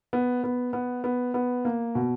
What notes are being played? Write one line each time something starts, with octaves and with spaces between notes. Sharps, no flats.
B3
B3
B3
B3
B3
A#3
B2